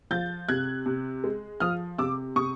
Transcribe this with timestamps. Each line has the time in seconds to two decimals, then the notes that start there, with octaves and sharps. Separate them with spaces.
0.11 F3 G6 A6
0.49 C3 F#6 G#6
0.86 C3
1.24 G#3
1.60 F3 D#6 F6
1.98 C3 D6 E6
2.36 C3 C#6 D#6